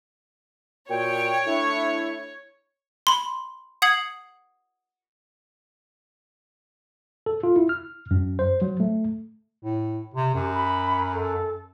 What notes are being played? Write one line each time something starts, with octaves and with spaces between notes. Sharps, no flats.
A#2 F#4 C#5 G5
A3 D4 E4
B5 C6
F#5 D#6 G#6 C7 F#7
A4
F4
E4
F6
F#2
C5
F#3
A3
A2
C3
F#2 G4
B5
A4